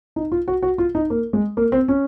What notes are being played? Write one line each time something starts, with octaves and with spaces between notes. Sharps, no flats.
D#4
F4
F#4
F#4
F4
D#4
A#3
G#3
A#3
C4
C#4